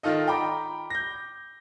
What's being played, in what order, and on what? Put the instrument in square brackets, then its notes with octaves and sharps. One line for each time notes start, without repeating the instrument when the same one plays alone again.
[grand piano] D#3 F4 A4 D#5
G5 A#5 B5 D6
G6 A#6